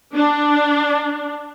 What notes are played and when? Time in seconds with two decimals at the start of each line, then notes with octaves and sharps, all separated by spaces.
0.15 D4